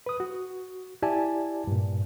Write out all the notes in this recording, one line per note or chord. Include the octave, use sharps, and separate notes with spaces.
B4 D#6
F#4
E4 G4 D5 G#5 A5
G2 A#2